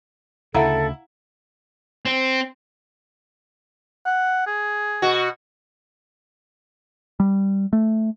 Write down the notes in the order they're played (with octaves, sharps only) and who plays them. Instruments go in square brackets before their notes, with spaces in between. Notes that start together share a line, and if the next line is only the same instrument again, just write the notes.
[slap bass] D2 C#3 [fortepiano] E4 [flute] A4 [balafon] F5 F#5 A#5
[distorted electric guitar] C4
[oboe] F#5
G#4
[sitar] B2 F#4
[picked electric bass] G3
A3